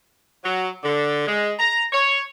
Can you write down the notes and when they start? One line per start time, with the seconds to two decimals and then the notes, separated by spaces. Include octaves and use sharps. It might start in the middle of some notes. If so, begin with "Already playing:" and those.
0.44 F#3
0.84 D3
1.27 G#3
1.59 A#5
1.92 C#5